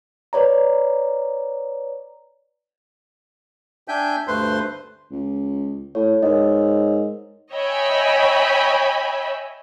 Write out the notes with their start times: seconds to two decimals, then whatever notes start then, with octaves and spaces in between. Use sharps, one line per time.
0.33 B4 C#5 D5 A#5
3.88 D4 E5 G5 G#5 G6
4.27 D2 G2 A3 B4 C5 C6
5.11 C#2
5.95 A2 C#5
6.23 G#2 A#4 C#5 D#5
7.54 C#5 D#5 E5 G5 G#5 B5